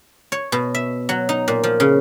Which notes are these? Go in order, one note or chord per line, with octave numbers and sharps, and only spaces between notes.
C#5
B2
E5
F#3
D#4
A#2
F3
C#3